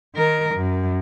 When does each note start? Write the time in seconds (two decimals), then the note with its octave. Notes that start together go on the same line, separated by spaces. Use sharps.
0.15 D#3 A#4
0.55 F#2